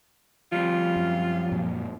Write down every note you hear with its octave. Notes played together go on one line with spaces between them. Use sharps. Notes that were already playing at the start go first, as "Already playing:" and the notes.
F3 G3 C4 F4
F#2
F#2 A#2 F#3